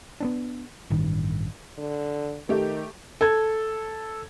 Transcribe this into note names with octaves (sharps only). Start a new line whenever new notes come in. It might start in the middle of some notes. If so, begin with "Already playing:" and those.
B3 C4 D4
A1 G2 D#3
D3
D#3 A3 G4
A4 G#6